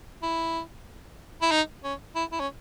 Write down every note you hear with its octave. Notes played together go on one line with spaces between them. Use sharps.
E4
E4
D#4
C#4
E4
E4
C#4